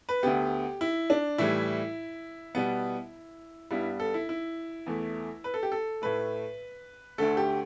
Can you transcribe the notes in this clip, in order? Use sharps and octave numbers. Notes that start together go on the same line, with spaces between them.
B4
D2 D3 B3 G4
E4
D4
A2 E3 G3 E4
B2 G3 B3
G2 G3 B3 E4
A4
E4
E4
E2 E3 A3
B4
A4
G4
A4
A2 A3 B4
D2 D3 A3 A4
G4